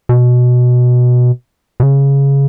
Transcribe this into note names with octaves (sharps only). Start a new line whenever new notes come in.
B2
B2
C#3